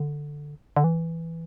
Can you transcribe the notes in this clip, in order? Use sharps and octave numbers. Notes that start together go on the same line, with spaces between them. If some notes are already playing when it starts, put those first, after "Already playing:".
Already playing: D3
D3
E3